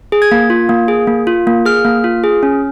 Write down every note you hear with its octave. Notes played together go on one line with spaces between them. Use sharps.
G#4
G#6
A#3
F4
A#3
G#4
A#3
F4
A#3
G#4 F6
A#3
F4
G#4
C#4